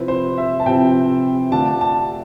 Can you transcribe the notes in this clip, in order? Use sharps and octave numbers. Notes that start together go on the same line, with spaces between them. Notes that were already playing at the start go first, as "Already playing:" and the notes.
Already playing: C3 F3 C4 E4 B4
C5
E5
A5
C3 F3 C4 E4 G5
D3 A3 D4 F4 A5
A5